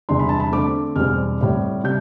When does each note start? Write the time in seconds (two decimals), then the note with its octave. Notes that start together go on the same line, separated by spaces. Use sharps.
0.09 E2 C3 G3 D4 C6
0.19 B5
0.29 A5
0.40 B5
0.52 D3 A3 C4 D6
0.96 E2 B2 G3 C4 F6
1.40 A2 G3 C4
1.84 C3 G3 G6